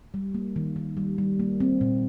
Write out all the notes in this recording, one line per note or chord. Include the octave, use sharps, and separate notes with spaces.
G3
A#3
D#3
D#3
G3
G3
A#3
C4
A#2